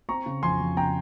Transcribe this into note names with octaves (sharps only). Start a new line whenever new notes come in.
C4 A#5 C#6
C#3
F2 G#5 C6
F2
C#3 G5 A#5